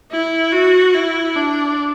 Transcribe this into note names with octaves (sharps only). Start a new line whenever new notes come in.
E4
F#4
E4
D4